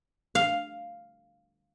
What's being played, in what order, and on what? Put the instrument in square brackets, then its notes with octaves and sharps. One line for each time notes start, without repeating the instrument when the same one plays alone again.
[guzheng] F5